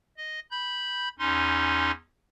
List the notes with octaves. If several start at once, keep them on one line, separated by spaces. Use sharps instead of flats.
D#5
B5 G6
E2 C#4 D#4 C6